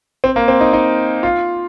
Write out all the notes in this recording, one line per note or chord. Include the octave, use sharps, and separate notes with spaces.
C4
A#3
C4
D#4
D#4
F4